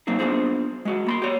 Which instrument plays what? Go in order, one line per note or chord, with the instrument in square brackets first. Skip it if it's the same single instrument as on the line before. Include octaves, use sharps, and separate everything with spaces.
[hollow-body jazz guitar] F#3 A#3 C4 D#4 G#4
B3 D4 F4 G#4 C5
G#3 F#4
A#3 B5 C6
G4 C#5